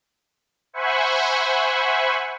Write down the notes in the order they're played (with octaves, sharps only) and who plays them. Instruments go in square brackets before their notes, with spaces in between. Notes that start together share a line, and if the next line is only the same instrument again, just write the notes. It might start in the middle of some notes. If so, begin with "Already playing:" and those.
[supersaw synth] C5 E5 F#5 G#5 B5 C#6